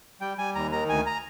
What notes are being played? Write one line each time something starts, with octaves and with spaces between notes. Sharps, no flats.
G3 G5
G3 G#5
D#2 A#5
D#3 A#5
D2 G#5
A#5